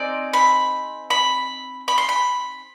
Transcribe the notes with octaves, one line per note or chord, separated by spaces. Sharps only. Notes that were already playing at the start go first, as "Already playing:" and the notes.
Already playing: C4 D#4 G#4 D5
B5
B5
B5
C6
B5